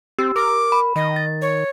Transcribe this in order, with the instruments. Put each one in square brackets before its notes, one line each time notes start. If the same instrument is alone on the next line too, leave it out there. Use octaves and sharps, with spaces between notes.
[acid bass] C4 [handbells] G4 E6
[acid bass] A#4 [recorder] D6
[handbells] B5
[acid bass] D#3 [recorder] D#5
[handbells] A6
[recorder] C#5